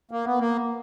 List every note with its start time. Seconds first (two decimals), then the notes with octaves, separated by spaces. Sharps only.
0.11 A#3
0.25 B3
0.39 A#3